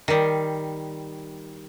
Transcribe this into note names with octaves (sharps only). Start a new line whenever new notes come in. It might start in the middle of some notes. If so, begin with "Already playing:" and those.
D#3 G3